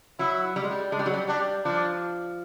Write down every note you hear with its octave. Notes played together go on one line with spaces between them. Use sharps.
F#3 E4
G3
G#3
G3
G#3 D4
G3
F#3
G3
G3 D4
F3 D4